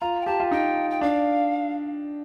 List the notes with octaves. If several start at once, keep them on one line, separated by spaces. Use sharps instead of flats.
F4 A#5
G5
G4 A5
F4
D#4 G5
G5
D4 F5